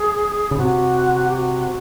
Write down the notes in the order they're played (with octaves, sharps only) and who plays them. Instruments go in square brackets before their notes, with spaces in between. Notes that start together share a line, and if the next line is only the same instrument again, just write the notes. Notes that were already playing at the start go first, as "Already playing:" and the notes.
Already playing: [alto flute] G#4
[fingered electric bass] C#3
[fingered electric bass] C3 [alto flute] F#4
[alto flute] G4
F#4